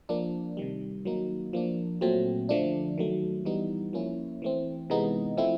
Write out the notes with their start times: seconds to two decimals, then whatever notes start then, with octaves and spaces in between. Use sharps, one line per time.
0.09 F3 A#3 D4
0.57 C3 D#3 G3
1.05 D#3 F#3 A#3 D#4
1.53 F3 A#3 D4
2.01 A#2 F#3 A3 C4
2.49 D3 F3 A3 D4
2.98 D#3 F#3 A3
3.45 E3 G3 B3 D#4
3.93 F3 A#3 C#4 E4
4.42 E3 A3 C4
4.90 C3 E3 G#3 B3 D#4
5.37 F3 A3 C4 E4